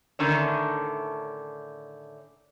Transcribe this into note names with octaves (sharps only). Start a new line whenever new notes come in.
A2 D3 D#3 C#4 D4